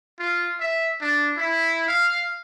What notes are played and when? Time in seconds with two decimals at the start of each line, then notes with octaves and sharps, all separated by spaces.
0.19 F4
0.59 E5
1.01 D4
1.37 E4
1.88 F5